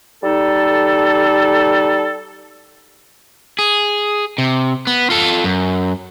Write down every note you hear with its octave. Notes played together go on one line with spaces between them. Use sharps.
G3 D#4 A4
G#4
C3
B3
F4 A4
F#2